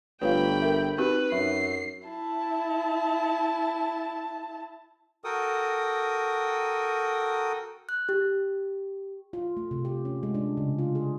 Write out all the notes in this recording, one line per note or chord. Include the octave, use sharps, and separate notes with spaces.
G1 A3 F4 B4 C#5 F5 G5 B5
A#4 E5
C4 D#4 F#4 G4 B4
F#2 D#4 E5 C7
E4 A5
F#4 A4 A#4 G5 D#6
F#6
G4
F4
A3
C3
G4
C#4
G#3
D4
C#3
F4
G#4